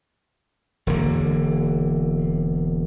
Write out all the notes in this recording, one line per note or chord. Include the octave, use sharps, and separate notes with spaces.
E1 D3 A#3